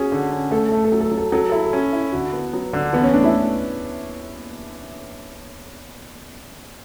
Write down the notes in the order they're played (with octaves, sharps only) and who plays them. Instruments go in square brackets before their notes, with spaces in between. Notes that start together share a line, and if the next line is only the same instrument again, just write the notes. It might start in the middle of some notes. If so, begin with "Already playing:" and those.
Already playing: [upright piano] C#4 [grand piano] F#4 G#4
[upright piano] D3
C#4
[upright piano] A3 [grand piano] A4
[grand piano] A4
[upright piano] A3
[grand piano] A4
[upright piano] F#3
[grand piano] A4
[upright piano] F#3
[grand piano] A4
[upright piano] F#3 [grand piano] A4
[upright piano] E4 [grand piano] A4
[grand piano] A4
[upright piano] C#4
E4
[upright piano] D3 [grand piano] F#4
[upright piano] B3
F#3
[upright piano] D3 [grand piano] D4
[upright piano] E3 [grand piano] B3
[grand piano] C#4
[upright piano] A3 [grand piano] D4
[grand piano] E4